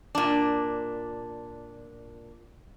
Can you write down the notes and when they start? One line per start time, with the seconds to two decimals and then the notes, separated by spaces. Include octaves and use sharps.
0.15 A#2 D4